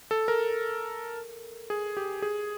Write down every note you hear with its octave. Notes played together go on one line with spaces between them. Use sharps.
A4
A#4
G#4
G4
G#4